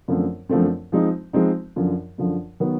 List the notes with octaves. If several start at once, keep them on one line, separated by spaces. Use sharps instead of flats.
F#2 D3 F3 A3 C4
F#2 D3 F3 A3 C4
F3 G#3 C4 D#4
F3 G#3 C4 D#4
F#2 D3 F3
F#2 D3 F3
D#3 F#3 B3